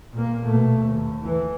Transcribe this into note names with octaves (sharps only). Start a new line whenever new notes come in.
A#2 A#3
B2 A3
D#2
E3